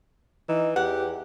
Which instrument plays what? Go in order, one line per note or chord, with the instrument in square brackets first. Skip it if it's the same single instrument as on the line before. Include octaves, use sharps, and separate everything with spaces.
[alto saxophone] E3 [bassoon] D#4
[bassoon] E2 [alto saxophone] G4 [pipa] F#5